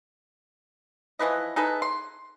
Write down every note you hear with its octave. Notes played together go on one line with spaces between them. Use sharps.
E3 F3 B4 D#5
D#4 G#4 A4 B4
C6